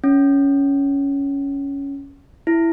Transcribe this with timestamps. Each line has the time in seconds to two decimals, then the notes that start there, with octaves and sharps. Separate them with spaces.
0.04 C#4
2.47 E4